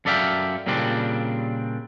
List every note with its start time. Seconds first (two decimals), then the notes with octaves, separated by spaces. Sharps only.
0.05 F#2 A4 D5 E5 F5 G5
0.67 A#2 C#3 G3 C4 D4